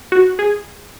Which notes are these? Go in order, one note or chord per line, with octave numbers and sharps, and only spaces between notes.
F#4
G#4